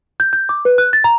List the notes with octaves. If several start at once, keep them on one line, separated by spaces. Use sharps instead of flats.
G6
G6
D6
B4
F#6
A6
A#5